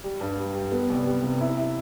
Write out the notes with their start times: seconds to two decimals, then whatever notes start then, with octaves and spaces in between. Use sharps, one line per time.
0.04 G3
0.21 G2
0.38 G3
0.55 G3
0.72 B3
0.89 C2
1.06 G3
1.23 C3
1.41 E4
1.58 E4